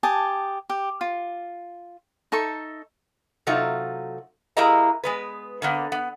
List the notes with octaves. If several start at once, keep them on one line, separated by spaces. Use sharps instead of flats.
G4 G#5 A5 D#6
G4
F4
D#4 A4 E5 C#6
C3 F#3 A3 D#4 F4
G#3 A#3 E4 G4 D#5 A#5
G#3 B3 B4
D3 A#3 B3
B3